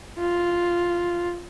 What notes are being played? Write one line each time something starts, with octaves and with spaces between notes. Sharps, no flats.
F4